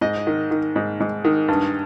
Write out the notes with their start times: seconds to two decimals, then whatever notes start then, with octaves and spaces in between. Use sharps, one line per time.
0.01 G#2 D#5
0.27 D#3
0.51 D#3
0.76 G#2
1.00 G#2
1.25 D#3
1.48 G2